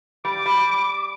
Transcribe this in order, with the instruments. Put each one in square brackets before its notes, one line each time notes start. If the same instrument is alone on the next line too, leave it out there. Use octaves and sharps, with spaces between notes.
[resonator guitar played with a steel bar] G3 [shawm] D6
[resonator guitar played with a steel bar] G3